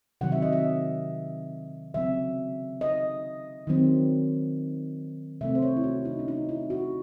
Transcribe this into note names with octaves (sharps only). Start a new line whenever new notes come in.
C3 D#3 F#3 F#5
E5
D#5
E5
C#3 F#3 C4 E5
D#5
D#3 F#3 C4
C3 F#3 A3 C4 E5
C5
C#5
E4
F#4
D#4
C#4
D#4
E4
F#4